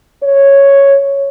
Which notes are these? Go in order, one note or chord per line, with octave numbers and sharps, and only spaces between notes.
C#5